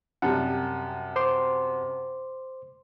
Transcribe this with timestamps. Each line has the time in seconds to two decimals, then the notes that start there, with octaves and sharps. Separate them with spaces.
0.22 F#2 C3 G3 F#5 G#5 A5
1.16 C5 C6 D6